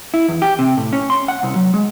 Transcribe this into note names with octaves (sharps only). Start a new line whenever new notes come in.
E4
E2
G4
C3
A2
C#4
C6
F#5
C2
F#3
G#3